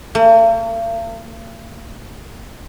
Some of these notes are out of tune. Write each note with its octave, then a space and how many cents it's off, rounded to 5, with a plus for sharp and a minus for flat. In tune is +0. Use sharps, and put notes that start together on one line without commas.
A#3 -45